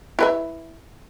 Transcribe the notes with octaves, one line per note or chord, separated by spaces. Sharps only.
E4 B4 E5